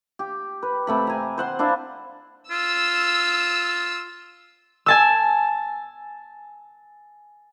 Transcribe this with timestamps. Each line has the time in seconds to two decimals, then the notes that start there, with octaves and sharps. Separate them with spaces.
0.19 G4
0.62 B4
0.87 C3 A3 B5
1.07 G#5 A#5
1.38 C5 F#5 C6
1.59 D4 E4 F5
2.51 F4 E6
4.86 G#5 A5 E6